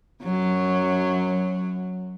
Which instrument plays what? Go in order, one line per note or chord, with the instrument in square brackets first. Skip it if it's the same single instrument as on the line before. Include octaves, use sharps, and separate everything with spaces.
[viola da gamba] F#2 F#3